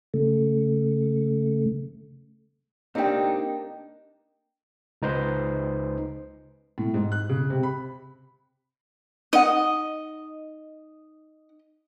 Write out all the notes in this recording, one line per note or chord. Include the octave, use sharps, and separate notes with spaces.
C#3 A3
A#3 C4 D4 D#4 G4 D#5 G5
C#2 D#4 B4 C5
A2
G#2
F#6
C#3
C3
B5
D#4 D#5 F#5